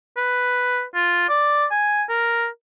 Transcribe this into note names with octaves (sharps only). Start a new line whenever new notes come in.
B4
F4
D5
G#5
A#4